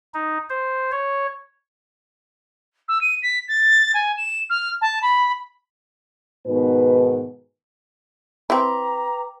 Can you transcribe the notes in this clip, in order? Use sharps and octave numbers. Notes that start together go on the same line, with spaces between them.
D#4
C5
C#5
E6
D#7
B6
A6
G#5
E7
F6
A5
B5
G#2 B2 D#3 B3 B4
C4 E4 B4 G5 A#5 D6